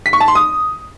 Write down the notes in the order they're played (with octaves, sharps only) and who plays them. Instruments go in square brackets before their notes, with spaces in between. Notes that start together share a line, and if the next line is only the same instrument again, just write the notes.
[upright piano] B6
C#6
A5
C6
D#6